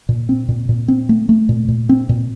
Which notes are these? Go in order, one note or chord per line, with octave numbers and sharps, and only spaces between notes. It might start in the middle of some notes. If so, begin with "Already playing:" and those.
A#2
C4
A#2
A#2
C4
A3
A3
A#2
A#2
C4
A#2